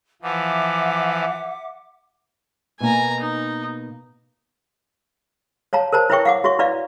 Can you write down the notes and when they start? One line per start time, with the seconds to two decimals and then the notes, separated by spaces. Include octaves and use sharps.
0.22 E3 F3 E5 F#5 D6
2.80 B2 A#3 D#5 G#5 A#5
3.20 D#4
5.73 C#5 F5 A5 A#5
5.93 A#4 C5 A5 A#5
6.10 E4 B4 C#5 E5 G5 C#6
6.25 F5 F#5 D6
6.44 F#4 C#5 E5 C#6
6.59 E4 B4 D5 F5